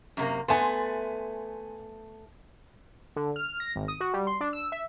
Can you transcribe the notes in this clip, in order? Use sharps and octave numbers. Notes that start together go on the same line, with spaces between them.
F#2 C3 A#3
A3 B3 G#5 C6
D3
F6
A#6
G#1
D#6
F#4
G3
C6
D4
E6
E5